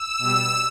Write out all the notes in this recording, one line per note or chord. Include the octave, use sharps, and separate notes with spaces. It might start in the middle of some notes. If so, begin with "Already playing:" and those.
Already playing: E6
B2 G3